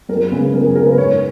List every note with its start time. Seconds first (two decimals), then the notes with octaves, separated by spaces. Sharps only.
0.09 F#2 A#4
0.31 C#3 G#3 B3 G#4
0.54 F#2 A#4
0.65 G#4
0.76 C#3 G#3 B3 A#4
0.87 B4
0.98 G#2 C#5